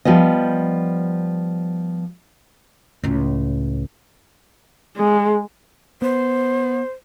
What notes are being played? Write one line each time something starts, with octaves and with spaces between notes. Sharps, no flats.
F3 G3 B3 D#5
C#2 A2
G#3
B3 C5